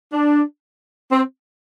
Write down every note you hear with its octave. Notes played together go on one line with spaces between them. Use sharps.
D4
C4